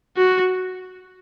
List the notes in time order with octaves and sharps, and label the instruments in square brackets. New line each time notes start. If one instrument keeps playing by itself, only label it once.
[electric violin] F#4